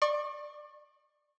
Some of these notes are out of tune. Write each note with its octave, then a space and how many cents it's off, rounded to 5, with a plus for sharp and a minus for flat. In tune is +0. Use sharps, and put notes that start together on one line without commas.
D5 +20 C#6 -30